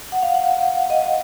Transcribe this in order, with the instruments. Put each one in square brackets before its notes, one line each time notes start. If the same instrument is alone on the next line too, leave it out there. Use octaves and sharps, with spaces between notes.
[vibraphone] F#5
F5
F#5
F5
D#5